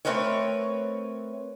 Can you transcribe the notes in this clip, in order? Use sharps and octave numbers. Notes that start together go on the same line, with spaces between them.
A3 A#3 C4 A#4 B4 C#5